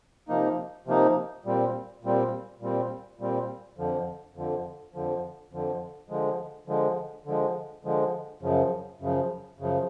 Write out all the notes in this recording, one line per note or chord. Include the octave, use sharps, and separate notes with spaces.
C3 F3 A#3 D#4
C3 F3 A#3 D#4
A#2 G3 C4
A#2 G3 C4
A#2 G3 C4
A#2 G3 C4
F2 D3 F3
F2 D3 F3
F2 D3 F3
F2 D3 F3
D3 F3 G#3
D3 F3 G#3
D3 F3 G#3
D3 F3 G#3
F#2 C#3 F3
F#2 C#3 F3
F#2 C#3 F3